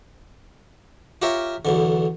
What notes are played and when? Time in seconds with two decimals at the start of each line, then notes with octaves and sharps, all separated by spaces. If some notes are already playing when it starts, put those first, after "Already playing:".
1.22 F4 G4 A#4 C#5 E5
1.65 B1 E2 D3